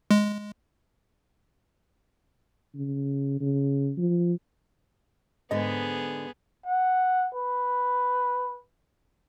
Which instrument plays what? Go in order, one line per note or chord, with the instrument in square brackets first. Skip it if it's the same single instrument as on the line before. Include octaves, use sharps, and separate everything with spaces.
[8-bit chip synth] G#3
[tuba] C#3
C#3
F3
[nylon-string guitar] G#2 D3 [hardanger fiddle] B3 G#4 [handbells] D#5
[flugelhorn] F#5
B4